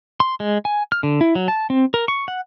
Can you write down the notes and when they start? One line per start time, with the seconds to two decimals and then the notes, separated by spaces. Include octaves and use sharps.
0.20 C6
0.40 G#3
0.65 G#5
0.92 F6
1.03 D3
1.21 E4
1.35 F#3
1.48 A5
1.70 C4
1.94 A#4
2.08 C#6
2.28 F#5